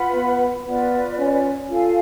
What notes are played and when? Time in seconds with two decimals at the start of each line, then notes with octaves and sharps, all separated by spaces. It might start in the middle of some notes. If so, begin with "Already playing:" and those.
Already playing: F4 B4 F#5 B5
0.15 B3
0.66 B3 F4 B4 D5
1.19 C#4
1.71 F4 A4 F5 G#5